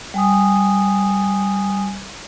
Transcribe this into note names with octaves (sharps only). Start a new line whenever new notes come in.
G3 G#5 D#6